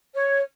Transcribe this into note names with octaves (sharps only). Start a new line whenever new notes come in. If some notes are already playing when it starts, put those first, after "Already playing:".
C#5